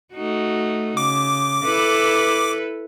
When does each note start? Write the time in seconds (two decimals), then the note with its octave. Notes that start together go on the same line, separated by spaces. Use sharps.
0.14 A3 D#4 F#4
0.97 C#3 D6
1.64 E4 A4 B4